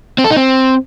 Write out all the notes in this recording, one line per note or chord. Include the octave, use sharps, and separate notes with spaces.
C4
A4
D#4
C4